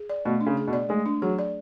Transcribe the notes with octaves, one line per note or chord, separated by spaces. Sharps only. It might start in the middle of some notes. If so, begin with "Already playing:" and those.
Already playing: G#4
D5
B2 A3
D4
C#3
G#4
B2
D5
G#3 A3
D4
F#3 G#4
D5